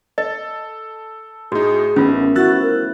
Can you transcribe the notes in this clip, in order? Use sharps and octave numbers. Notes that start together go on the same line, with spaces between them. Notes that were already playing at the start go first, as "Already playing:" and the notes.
A4 D#5
A2 D#4 F#4 G#4
A1 D#3 A3 B3 C#4 F4
F3 E4 F#4 E6 F#6 A6
A#4